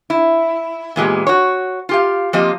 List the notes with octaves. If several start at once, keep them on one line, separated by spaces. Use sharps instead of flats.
E4
E2 A#2 G#3 G4
F#4 C#5
F4 G4 F5
F3 A#3 C4 F4 G4 D#5